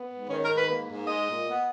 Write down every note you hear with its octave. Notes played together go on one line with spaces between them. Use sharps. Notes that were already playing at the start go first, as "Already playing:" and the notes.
Already playing: B3
G#2
D#3 C#4
A#4
G#2
B4
A#3
G#2
G#3 D#5
A#2
B3